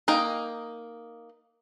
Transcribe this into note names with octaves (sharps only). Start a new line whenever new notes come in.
A#3 D#4 D#5 G5